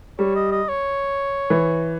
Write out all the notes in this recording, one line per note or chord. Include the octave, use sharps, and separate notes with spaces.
G3 C#5
D#5
D#5
C#5
E3